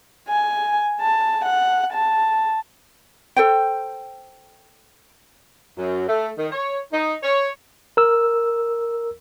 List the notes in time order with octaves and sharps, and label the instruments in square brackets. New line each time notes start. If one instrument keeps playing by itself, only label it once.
[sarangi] G#5
A5
F#5
A5
[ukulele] A4 C5 G5
[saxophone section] F#2
A3
D#3
C#5
D#4
C#5
[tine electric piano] A#4 E6